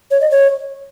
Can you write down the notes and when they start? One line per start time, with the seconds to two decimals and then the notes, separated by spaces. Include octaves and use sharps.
0.11 C#5
0.21 D#5
0.31 C#5